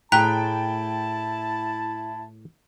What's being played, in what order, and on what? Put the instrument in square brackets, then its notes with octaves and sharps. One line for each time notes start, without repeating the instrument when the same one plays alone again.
[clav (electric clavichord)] A2 G#4 [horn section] E4 A5 [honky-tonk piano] G5 [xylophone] A#5 F#6 B6